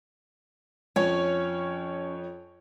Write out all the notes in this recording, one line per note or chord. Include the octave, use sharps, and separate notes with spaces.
F2 F3 C#4 C#5